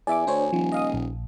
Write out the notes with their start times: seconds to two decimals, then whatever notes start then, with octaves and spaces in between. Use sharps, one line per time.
0.07 E2 D5 E5 G#5 D6
0.27 D2 D4 C5 C#5
0.53 D#1 F3
0.72 D#5 F5 D#6
0.93 A#1